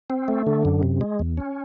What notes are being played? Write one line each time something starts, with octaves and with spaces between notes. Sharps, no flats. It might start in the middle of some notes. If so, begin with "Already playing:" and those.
C4
A3
D3
F#2
C3
G#3
E2
C#4